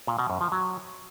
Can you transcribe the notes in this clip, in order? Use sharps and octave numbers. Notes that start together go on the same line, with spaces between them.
A#2
B2
F#2
F3
F#3